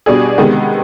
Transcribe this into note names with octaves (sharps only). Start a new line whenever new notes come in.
B2 G3 D4 G#4
C3 D#3 G#3 B3